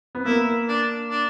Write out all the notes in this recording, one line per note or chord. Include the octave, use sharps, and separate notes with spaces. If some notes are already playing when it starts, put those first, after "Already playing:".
B3
A#3 E4
D4
D4